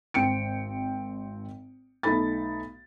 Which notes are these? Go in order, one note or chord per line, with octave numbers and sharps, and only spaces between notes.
G#1 C4 G5 C#7 D7
B1 A3 D#4 A4 B5 A6